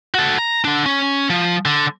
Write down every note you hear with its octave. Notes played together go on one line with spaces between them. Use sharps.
F#4 A4
A#5
D3 D4
C#4
F3
D3